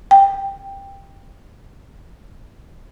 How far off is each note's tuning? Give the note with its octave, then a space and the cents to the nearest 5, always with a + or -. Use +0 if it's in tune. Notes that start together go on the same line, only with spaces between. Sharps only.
G5 +10